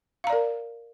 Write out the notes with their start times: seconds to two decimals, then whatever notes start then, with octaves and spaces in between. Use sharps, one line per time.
0.24 F5
0.27 A#5
0.30 D5
0.33 A#4